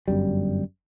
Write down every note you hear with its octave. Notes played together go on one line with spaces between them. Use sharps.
G1 F#2 G3